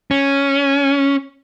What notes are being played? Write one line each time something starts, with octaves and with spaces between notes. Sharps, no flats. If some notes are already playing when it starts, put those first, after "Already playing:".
C#4